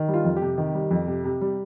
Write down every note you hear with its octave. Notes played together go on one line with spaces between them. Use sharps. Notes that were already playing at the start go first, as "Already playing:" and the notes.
Already playing: D#3
G3
F4
F2
G4
C3
D#3
G3
F2
C3
C3
G3